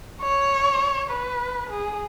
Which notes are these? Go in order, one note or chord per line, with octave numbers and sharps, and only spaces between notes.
C#5
B4
G#4